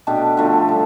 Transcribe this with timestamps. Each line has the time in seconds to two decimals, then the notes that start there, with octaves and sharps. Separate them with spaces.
0.07 B2 A3 D4 G4
0.37 D3 F3 A3
0.68 G3 D4 A4